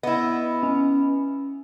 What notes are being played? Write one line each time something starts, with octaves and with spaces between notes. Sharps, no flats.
B3 E4 D#5
C#4